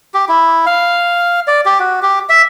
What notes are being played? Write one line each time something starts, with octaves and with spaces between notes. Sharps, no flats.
G4
E4
F5
D5
G4
F#4
G4
E5